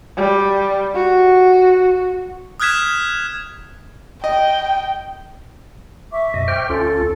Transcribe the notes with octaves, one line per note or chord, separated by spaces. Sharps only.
G3
F#4
D#6 F6 F#6 G#6 B6 E7
D#5 G5
E5 C#6 D6
F#2 B2 D#5
C5 G5 F6
D2 C#4 F4 A4